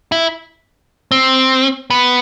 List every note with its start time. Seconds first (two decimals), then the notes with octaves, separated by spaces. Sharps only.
0.12 E4
1.11 C4
1.90 B3